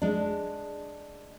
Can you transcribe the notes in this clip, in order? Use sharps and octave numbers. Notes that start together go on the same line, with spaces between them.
G#3 D4